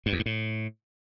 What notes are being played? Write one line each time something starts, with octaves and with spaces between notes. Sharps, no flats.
G2
E2
G2
A2